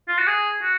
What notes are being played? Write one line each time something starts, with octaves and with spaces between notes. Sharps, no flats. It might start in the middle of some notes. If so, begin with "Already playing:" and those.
F4
F#4
G#4
F#4